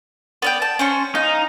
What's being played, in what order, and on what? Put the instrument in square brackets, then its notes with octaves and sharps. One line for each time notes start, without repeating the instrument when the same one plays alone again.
[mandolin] B3 D5 G5
A5
C#4 C5 C#6
[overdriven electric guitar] D#4 [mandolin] F5